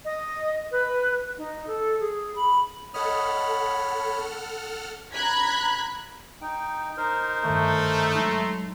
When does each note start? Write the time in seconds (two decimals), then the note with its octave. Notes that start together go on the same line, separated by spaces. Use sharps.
0.05 D#5
0.71 B4
1.38 D#4
1.67 A4
2.00 G#4
2.36 B5
2.94 A4 C#5 D#5 F#5 B5 F6
5.12 A#5 B5 F#6 G#6 B6
6.41 D#4 G5
6.97 D#4 A#4 C5
7.45 G2 D#3 A3
8.15 F#3 G#3 D#4 A#5 C6